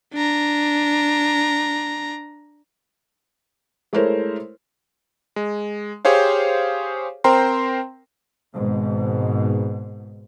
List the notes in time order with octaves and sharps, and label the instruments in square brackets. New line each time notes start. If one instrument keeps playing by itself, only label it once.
[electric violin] D4 A#5
[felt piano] G#3 A3 E4 A#4 C5 C#5
[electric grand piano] G#3
G4 G#4 C5 C#5 F5
C4 A#4 C5 G5 A#5 C6
[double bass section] G#1 G#2 B2